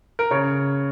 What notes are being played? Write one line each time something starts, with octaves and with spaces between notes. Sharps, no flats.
A#4
C#3 C#5